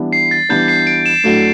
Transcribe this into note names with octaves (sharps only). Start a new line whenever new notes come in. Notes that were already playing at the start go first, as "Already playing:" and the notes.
Already playing: E3 G3 B3 D4
C7
A6
E3 G3 B3 D4 G6
C7
D7
E7
A2 F#3 A3 D4 F#4